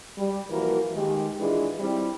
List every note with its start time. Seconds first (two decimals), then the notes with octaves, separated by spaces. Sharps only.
0.18 G3
0.50 A#2 E3 F3 A#3 F#4 A#4
0.94 D#3 G#3 G4
1.40 A#2 E3 G#3 D4 F4 G#4
1.79 G3 C4 E4